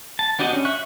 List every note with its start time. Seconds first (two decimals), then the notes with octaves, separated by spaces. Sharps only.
0.19 A5
0.39 B3 D4 F#4 G4 D#5
0.53 C#4
0.65 E5 C#6 F#6